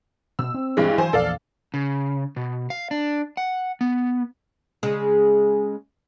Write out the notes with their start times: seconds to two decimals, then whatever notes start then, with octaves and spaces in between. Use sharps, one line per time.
0.39 B2 E6
0.54 C4
0.77 G2 E3 G#3
0.98 E3 F#3 C5 G#5
1.13 A#1 E2 A4 D5 F5
1.74 C#3
2.36 B2
2.70 F5
2.91 D4
3.37 F#5
3.81 B3
4.83 C#3 G#3